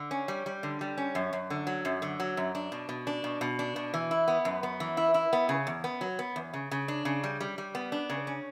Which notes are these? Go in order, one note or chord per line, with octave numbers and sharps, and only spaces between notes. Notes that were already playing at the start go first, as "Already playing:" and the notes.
Already playing: D3
C#4
G3
G3
D3
G3
C#4
F#2
F#2
D3
F#3
F#2
D3
F#3
F#2
D4
B2
B2
D4
B2
B2
D4
B2
E3
E4
B3
F#2
B3
E3
E4
E4
B3
C#3
E2
B3
F#3
B3
E2
C#3
C#3
D4
C#3
G3
G3
G3
B3
D4
C#3
C#4